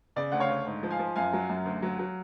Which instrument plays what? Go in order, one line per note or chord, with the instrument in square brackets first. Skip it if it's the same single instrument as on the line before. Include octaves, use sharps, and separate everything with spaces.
[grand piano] C#3 D5
D2 F#5
C#5 F5
D2
G#2
F3
F5 G#5
F3
F#2 F5 G#5
F#3
F#2
D2
F#3
F#3